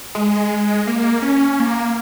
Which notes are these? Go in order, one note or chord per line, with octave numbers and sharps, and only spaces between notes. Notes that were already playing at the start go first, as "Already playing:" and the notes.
G#3
A#3
C#4
A#3